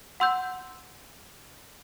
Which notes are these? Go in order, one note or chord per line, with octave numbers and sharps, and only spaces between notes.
F#5 C6 E6 G6